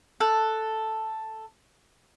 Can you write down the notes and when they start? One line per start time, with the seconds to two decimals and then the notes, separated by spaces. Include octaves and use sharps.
0.20 A4 F#6